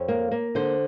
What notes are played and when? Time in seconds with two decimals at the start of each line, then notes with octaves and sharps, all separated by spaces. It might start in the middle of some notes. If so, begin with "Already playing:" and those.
Already playing: F2 C#5
0.08 A#3
0.31 A#3
0.55 D3 C5